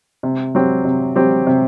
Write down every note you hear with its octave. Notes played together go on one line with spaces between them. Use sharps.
C3
F#3 C4 G4
C3
F#3 C4 G4
C3